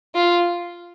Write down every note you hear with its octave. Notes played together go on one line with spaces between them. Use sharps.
F4